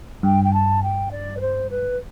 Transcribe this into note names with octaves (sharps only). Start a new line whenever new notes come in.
G2 G5
G5
A5
G5
D5
B4
C5
B4